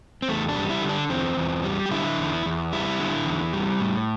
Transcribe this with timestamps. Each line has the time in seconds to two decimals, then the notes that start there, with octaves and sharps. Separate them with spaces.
0.22 C4
0.28 E2 A3
0.49 D4
0.56 G3
0.70 E4
0.82 D3
0.89 D4
1.10 E2 C4
1.37 E2
1.64 G3
1.86 G4
1.91 D3 E4
2.18 E2
2.46 E2
2.72 G3 E4
3.00 D3
3.26 E2
3.53 G3
3.80 A2